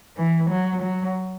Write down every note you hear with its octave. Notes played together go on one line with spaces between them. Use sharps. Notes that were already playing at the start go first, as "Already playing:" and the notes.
E3
F#3
F#3